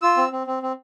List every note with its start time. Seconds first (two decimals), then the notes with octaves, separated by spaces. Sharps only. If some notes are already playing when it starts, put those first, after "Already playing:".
0.02 F4 E6
0.17 C4
0.32 C4
0.47 C4
0.63 C4